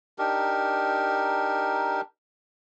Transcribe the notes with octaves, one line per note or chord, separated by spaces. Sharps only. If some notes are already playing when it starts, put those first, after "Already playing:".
D4 D#4 G4 A#4